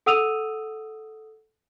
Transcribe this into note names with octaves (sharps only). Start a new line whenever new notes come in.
A4 F#5 D#6 E6 D#7 F7